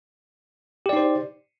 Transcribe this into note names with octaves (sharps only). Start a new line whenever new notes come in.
D#4 G4 C5 D5